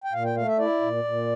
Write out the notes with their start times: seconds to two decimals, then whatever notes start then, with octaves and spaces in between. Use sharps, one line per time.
0.04 G5
0.13 A#2 F5
0.24 G5
0.36 A3 F5
0.47 E5
0.59 E4 D5
0.81 A#2
1.04 A#2